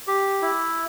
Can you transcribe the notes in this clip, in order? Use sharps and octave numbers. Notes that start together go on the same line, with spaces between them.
G4
E4